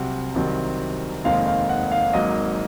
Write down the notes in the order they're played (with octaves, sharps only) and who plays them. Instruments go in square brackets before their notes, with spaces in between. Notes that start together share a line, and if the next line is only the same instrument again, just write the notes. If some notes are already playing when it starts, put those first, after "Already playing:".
Already playing: [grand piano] C2 C3 F#3 C4 F#5
C2 C3 D#3 F#3 C4
F1 D#2 D#3 G#3 C4 F5
F5
F#5
F5
G#1 G#2 F#3 A#3 D#5